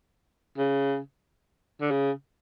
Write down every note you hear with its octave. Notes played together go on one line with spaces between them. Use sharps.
C#3
D3
C#3